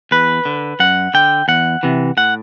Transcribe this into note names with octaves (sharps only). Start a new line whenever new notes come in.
E2 B4
D3
F#2 F#5
D3 G5
E2 F#5
C3 E3
A2 F#5